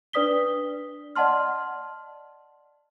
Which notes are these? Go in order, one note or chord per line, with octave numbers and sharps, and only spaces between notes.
D4 B4 D5 D#6 B6 G7
D5 D#5 F#5 A5 C6 F6